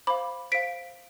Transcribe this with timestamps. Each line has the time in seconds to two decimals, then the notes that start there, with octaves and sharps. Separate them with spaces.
0.07 C5 B5 D6
0.10 F5
0.52 C5 F5 B6 D7